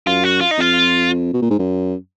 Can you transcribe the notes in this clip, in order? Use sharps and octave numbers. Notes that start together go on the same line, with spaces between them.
F#2 F4
F#4
F4
D#4
F2 F4
B2
A#2
G#2
F#2